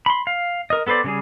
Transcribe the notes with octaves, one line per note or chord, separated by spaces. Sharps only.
B5 C6
F5
A#4 D#5
B3 A4 B4 C5 D5
C#3 G3 G#4